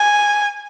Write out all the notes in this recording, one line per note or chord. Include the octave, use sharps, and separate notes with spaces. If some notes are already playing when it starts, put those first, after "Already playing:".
Already playing: G#5